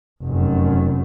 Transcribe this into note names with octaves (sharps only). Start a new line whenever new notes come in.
F1 F#2